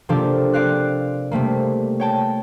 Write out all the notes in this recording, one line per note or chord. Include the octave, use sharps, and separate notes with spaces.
C3 F3 A#3 D4 G4 A4
C4 D5 F5 F#6
C3 G3 A3 A#3
C#5 G5 A5